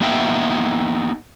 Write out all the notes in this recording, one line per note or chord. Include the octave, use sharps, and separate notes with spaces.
A#3 B3 D#4 E5 G5